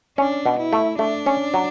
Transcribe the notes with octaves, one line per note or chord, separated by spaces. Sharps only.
C#4 D4
B2
E4
A3
A3 D4
C#4
F#3